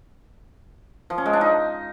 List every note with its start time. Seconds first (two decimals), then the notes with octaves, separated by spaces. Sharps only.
1.10 F3
1.18 C#4
1.26 G#3
1.33 D4
1.41 D#4